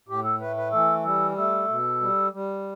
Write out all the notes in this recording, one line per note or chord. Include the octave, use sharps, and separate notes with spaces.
A2 G4
A4
A3 B4
B4
E3 A4
G3 A4
A3 A4
B2
G3
G3